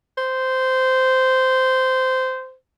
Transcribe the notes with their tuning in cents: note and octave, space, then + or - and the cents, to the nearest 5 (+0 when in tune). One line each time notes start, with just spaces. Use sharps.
C5 -15